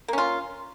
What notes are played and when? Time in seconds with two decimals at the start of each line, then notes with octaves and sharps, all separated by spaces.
0.08 A#3
0.13 C#4
0.18 F4